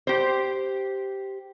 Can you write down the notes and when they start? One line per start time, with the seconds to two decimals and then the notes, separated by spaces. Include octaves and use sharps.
0.07 G4 C5